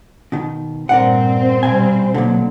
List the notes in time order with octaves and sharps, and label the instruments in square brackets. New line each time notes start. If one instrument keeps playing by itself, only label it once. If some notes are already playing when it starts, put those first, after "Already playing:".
[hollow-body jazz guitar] B2 D#3
[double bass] G2 A#2 [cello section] C4 C5 [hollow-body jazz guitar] A#4 D5 F#5
[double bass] B2 G3 [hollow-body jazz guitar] F5 G#5
[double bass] B2 F#3 [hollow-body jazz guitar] D3 A#3